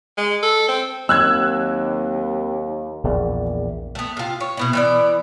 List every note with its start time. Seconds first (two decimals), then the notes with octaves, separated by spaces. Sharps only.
0.17 G#3
0.43 A4
0.68 C4
1.09 D#2 F#3 C4 F#5 E6 F#6 G#6
3.04 A#1 E2 G#4 A#4 D5
3.95 A3 B3
4.17 C3 F4
4.40 C#5
4.57 B2 B3 E4
4.73 E3 B3 D5